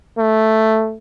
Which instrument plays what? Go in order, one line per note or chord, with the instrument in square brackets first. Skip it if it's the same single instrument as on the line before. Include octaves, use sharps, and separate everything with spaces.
[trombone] A3